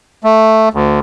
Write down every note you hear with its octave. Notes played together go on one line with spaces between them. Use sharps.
A3
D2